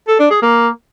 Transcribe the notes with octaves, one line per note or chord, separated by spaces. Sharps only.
A4
D4
G#4
A#3